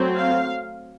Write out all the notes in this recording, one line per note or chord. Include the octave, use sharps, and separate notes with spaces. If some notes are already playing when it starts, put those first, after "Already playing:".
Already playing: F#3 A3 C4
F5